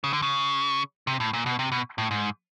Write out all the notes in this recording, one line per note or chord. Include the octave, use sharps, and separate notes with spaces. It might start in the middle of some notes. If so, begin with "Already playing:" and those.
C#3
D3
C#3
C3
A2
A#2
B2
C3
B2
A2
G#2